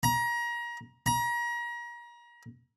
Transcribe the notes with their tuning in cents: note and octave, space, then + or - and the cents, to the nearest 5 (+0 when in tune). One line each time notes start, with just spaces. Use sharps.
A#5 +30
A#5 +35